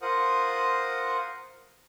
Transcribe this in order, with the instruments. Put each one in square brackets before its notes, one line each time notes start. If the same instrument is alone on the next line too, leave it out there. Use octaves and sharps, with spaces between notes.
[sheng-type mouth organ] F4 A#4 C5 F#5 D#6